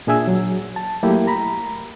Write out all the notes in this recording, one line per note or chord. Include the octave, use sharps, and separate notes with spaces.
A#2 D4 G#4 E5 G#5 E6
F#3
A5
F#3 A3 A#3 E4 G4
A#5 B5